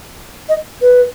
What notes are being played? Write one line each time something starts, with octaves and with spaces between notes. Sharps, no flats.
D#5
B4